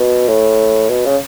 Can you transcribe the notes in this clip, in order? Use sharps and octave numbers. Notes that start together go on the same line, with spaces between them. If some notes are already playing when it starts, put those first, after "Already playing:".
Already playing: B2
A2
B2
C#3